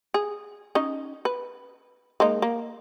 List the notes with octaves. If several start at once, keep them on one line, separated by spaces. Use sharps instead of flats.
G#4
C#4 D#4 D#5
B4
G#3 A#3 D#4
A#3